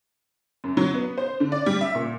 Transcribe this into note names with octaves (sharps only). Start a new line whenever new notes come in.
F#2
F#3
B3
C5
D3
D5
G3
E5
A#2